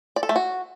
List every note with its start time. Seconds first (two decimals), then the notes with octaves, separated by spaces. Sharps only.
0.16 D5
0.23 A4
0.29 A3
0.36 F#4